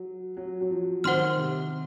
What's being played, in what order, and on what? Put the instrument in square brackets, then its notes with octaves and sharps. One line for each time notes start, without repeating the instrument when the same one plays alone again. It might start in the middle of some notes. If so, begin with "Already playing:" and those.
Already playing: [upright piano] F#3
F#3
F#3
F3
[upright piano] D#3 [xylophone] C5 F#5 C6 F6
[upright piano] C3